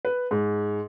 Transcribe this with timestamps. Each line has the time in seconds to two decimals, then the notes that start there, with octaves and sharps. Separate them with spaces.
0.05 B4
0.31 G#2